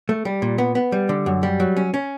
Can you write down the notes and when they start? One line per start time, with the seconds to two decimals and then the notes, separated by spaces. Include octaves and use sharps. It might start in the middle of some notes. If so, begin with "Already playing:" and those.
0.09 A3
0.25 G3
0.42 A#2
0.58 B3
0.75 B3
0.92 G3
1.09 D3
1.26 F#2
1.43 G3
1.60 F#3
1.77 C#4
1.94 C#4